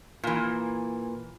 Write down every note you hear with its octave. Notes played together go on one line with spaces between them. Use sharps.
A#2 E3